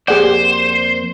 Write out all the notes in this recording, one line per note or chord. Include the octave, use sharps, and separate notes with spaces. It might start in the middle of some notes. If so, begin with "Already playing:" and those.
F2 A#3 G4 G#4 C5 D5 F#5